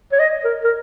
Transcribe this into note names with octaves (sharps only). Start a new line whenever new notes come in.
C#5
D#5
A#4
A#4